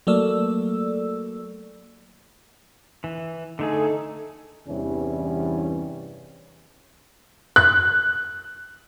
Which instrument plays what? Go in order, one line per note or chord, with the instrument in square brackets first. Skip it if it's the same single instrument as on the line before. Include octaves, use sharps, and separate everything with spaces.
[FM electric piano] F#3 A3 A#3 A4 D5 E6
[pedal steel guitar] E3
[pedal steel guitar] D3 A3 G#4 [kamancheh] D#4 A4
[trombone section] E2 G2 C3 E3 G3 C#4
[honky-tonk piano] F#6